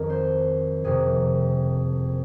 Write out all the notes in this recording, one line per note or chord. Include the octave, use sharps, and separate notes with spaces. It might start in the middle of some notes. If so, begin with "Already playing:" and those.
Already playing: F2 D#3 F#3 A#4
C5
F#1 F2 C3 F3 A#3 G#4